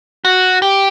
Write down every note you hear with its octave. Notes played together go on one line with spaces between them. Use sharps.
F#4
G4